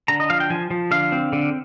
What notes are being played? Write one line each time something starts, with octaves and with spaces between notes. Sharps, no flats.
D3 A#5
D#5
F3 F5
G5
F3 G#5
F3
D3 F5
C4
D3